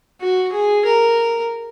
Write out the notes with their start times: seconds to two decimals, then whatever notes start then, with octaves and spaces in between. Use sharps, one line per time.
0.20 F#4
0.52 G#4
0.85 A#4